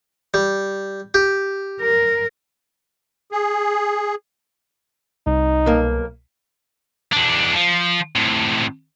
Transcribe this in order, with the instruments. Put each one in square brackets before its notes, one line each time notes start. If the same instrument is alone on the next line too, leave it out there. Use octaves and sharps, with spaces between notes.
[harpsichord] G3
G4
[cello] A#4
[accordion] G#4
[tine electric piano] C2 [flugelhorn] D#4
[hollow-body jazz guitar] B1 A#3
[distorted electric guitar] E2 D4
F3
A2 C3